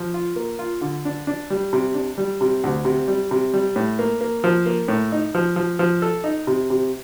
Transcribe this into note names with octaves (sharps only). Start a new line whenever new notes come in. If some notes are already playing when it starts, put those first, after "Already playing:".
Already playing: F3
F4
A#3
F4
D3
D4
D4
G3
C3
D4
G3
C3
D2
C3
G3
C3
G3
A2
A#3
A#3
F3
A#3
A2
D#4
F3
F3
F3
A4
D#4
C3
C3